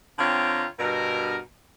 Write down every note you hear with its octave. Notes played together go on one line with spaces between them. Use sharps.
D3 C4 F4 C#5 G5 A#5
G2 B2 A#4